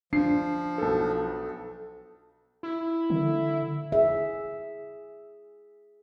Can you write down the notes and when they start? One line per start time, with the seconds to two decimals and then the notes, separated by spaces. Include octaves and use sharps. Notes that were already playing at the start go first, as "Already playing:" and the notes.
0.13 F3 D4 C7
0.78 B1 A4
2.63 E4
3.10 D3
3.92 G#4 E5